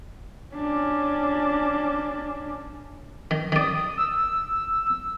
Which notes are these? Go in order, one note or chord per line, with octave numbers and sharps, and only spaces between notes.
C#4 D4
D#3
D#3 D5 D#6
E6